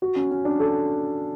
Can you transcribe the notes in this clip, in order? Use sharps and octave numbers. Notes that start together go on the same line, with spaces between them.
F#4
C#4
C#4
D4
A4